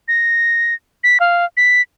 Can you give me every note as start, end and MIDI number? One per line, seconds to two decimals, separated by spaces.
0.08 0.74 94
1.04 1.18 95
1.20 1.45 77
1.57 1.82 95